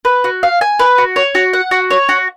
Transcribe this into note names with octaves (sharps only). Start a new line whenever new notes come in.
B4
F#4
F5
G#5
B4
F#4
C#5
F#4
F#5
F#4
C#5
F#4